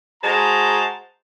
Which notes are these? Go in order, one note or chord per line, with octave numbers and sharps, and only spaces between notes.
G#3 F#4 C5 A5 A#5